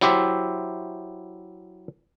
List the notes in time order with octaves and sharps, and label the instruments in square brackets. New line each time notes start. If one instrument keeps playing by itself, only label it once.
[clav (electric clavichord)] F#3 E4 G4 C5 E5